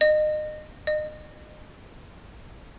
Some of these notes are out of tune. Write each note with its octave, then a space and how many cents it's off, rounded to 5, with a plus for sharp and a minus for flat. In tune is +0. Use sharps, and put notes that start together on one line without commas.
D#5 -30
D#5 -35